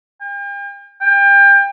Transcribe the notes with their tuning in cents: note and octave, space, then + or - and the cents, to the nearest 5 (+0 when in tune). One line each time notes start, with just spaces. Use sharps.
G5 +40
G5 +30